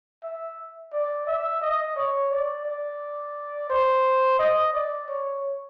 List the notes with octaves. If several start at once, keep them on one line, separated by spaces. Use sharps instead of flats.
E5
D5
E5
D#5
C#5
D5
D5
C5
D#5
D5
C#5